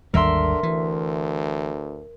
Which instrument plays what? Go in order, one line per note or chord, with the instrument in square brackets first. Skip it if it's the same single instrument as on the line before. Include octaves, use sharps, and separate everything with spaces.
[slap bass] G#1 D#2 G3 [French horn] D3 [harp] A#4 E5 C6
[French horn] D2 [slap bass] E3